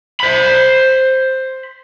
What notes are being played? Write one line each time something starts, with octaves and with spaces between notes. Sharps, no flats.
C5 B5